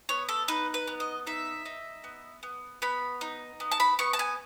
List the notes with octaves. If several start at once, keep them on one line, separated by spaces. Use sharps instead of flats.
B3 C#5
A4
D#4 B4
B4
B3
D#5
D#4 E5
D#4
B3
B3
B3 B5
D#4
B3
A5
B5
B3 C#6
A5
G#5